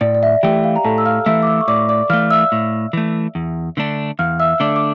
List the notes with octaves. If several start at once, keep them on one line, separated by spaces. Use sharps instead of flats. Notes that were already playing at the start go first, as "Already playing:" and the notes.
A2 D5
D5
E5
E3 A3 G4 G5
F5
A#5
A2 A4 A5
E6
F5 F6
E3 A3 E5 E6
D6
E5 E6
C#6
A2 D5 D6
D5 D6
E3 A3 F5 F6
E5 E6
A2
E3 A3
E2
D3 A3 D4
E2 F5 F6
E5 E6
D3 A3 D4 D5 D6
D6